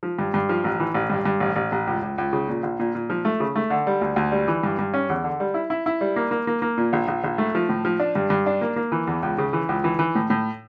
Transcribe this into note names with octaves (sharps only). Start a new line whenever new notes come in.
F3
G2
G2
F3
A1
E3
A1
G2
G2
A1
A1
A1
C#2
C#2
C#2
C#3
A#2
A#1
A#2
A#2
F3
A3
C#3
A3
D3
G3
D2
D2
G3
E3
G2
G2
C#4
E2
D3
G3
E4
E4
E4
G3
A#3
A#3
A#3
A#3
A#2
A#1
A#1
A#1
A3
F3
A2
F3
D4
G2
G2
D4
A#3
A#3
E3
E2
C#2
C#3
E3
C#2
E3
E3
A2
A2